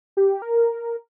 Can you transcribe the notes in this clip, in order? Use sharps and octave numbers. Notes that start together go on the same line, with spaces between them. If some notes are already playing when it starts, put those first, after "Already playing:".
G4
A#4